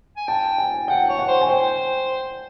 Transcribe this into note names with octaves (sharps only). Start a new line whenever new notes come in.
G#5
G5 A5
G#5
F#5 G5
C#5
F#5
C5
G#5
C5 G5